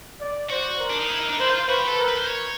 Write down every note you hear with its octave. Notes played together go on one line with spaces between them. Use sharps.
D5
F#4 C5
A#4
D4
D#4
E4
D#4
D4
E4 C5
F4
F#4 B4
G4
A4
A#4
B4
C5
C#5